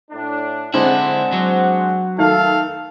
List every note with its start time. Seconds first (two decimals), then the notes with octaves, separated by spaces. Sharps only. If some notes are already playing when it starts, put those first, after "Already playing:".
0.11 A2 D4
0.74 D3 G#3 C4 D4 E4 F#5
1.32 F#3
2.18 D#3 A3 A4 F5